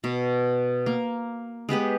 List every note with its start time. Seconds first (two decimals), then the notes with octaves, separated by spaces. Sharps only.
0.04 B2
0.86 A#3
1.69 G#3 B3 G4 B4